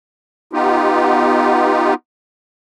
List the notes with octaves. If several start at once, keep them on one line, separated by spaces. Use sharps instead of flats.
B3 D#4 F4 G4